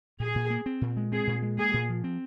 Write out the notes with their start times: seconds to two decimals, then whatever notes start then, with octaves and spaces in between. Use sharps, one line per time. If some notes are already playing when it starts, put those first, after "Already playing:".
0.20 A#2 G#4
0.35 A#2
0.50 A#3
0.66 C4
0.81 A#2
0.97 G#3
1.12 C4 G#4
1.27 A#2
1.42 G#3
1.58 A#3 G#4
1.74 A#2
1.89 F3
2.04 C4